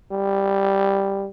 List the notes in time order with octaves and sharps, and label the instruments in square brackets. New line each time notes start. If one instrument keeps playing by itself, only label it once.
[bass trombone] G3